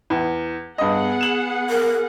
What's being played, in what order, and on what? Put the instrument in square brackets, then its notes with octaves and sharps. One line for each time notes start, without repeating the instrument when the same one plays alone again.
[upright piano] E2
[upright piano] G2 D#5 [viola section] B3 G#4 F#5
[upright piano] E7 F#7
[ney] A#4